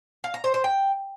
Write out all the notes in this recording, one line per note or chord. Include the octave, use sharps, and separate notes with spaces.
F5
A#5
C5
C5
G5